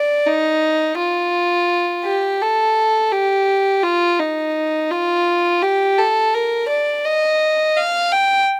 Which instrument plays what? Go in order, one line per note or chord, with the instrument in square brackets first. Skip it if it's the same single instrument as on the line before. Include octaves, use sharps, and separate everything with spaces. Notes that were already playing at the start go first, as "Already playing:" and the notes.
Already playing: [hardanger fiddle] D5
D#4
F4
G4
A4
G4
F4
D#4
F4
G4
A4
A#4
D5
D#5
F5
G5